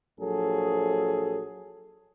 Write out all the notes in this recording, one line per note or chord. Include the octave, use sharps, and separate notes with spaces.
A#1 F#3 G#4 A4